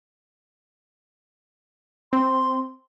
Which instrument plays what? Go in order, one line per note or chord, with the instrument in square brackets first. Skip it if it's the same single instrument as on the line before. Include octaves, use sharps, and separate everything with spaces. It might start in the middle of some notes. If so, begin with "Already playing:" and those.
[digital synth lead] C4 [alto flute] C6